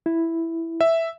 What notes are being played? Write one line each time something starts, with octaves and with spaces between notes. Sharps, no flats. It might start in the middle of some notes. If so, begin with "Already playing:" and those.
E4
E5